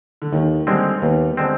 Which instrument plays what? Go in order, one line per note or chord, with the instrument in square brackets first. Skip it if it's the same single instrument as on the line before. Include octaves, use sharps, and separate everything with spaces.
[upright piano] D3
[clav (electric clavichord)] D#2 [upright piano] D#3
[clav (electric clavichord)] D3 G#3 C4 [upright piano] G3
[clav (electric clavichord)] D#2 [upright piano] B3
[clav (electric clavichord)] D3 G#3 C4